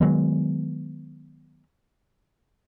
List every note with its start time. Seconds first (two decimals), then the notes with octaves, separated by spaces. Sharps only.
0.01 D#3 F#3 G#3 B3